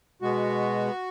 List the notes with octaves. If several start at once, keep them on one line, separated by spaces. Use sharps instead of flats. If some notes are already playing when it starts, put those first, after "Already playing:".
B2 G#3 B3 F#4